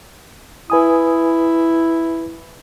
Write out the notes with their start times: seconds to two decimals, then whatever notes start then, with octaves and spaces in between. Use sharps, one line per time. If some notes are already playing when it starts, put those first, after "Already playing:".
0.70 E4 B4 G#5 D#6